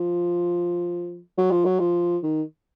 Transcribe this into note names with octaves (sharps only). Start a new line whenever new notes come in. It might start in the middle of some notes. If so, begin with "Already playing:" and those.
Already playing: F3
F#3
F3
F#3
F3
D#3